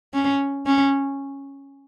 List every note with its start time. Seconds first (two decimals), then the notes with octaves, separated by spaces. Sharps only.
0.14 C#4
0.66 C#4